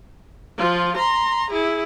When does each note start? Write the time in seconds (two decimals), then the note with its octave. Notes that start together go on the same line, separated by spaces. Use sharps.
0.58 F3 F4
0.97 A#5 C6
1.51 E4 G#4